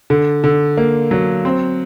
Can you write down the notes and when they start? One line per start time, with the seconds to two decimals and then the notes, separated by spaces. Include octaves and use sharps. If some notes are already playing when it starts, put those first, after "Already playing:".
0.10 D3
0.44 D3
0.77 A#3
1.11 F#3
1.45 C4